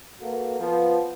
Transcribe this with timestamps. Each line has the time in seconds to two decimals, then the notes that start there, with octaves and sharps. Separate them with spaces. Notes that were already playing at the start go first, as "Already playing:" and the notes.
0.21 A#3 F#4 A4 B4
0.59 F3 B3